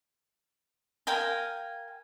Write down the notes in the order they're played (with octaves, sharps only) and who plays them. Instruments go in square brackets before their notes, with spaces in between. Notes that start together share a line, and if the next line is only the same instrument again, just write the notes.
[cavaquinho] A#4 F5 G5 G#5